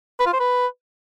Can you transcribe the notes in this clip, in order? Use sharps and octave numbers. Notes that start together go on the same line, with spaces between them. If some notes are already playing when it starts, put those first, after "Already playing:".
B4
F4
C5
B4